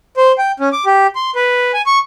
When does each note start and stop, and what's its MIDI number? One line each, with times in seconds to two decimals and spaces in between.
0.17 0.32 72
0.38 0.52 79
0.60 0.69 61
0.73 0.85 86
0.86 1.07 67
1.15 1.31 84
1.35 1.72 71
1.74 1.82 80
1.86 1.99 85